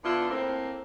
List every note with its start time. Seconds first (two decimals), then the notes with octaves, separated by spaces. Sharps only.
0.04 D3 B3 E4 F4
0.30 A2 A#3 C4